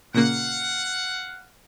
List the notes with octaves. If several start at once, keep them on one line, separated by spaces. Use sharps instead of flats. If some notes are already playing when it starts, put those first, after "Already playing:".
A#2 C#3 A#3 F5 F#5